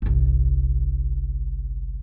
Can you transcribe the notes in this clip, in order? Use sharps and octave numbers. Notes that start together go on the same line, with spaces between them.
G1 C2